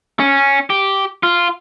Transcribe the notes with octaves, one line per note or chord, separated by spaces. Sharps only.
C#4
G4
F4